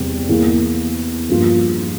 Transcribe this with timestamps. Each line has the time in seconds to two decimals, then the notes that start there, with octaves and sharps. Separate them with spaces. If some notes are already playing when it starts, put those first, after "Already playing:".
Already playing: E2 C3 G3
0.29 E2 E3 A#3
1.29 G2 F3 A#3 F4